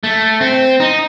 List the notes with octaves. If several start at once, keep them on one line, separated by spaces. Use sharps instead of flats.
A3
C4
D#4